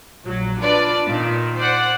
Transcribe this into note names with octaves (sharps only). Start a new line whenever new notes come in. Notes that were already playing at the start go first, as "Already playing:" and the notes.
A#1 F#3
D4 F4 B4 D5
A#2 D#3
C5 D5 F#5